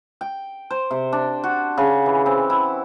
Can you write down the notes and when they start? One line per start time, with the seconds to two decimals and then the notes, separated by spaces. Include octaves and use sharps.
0.21 G5
0.70 C5
0.91 C3
1.13 D4
1.44 F#4
1.78 C#3
2.06 E3
2.26 C4
2.50 E4